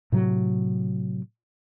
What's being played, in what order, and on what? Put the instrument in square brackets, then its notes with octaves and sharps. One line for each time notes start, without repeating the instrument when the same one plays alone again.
[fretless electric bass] A2 C3 F#3